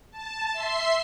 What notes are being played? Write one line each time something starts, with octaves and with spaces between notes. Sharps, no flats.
A5
E5 C6 C7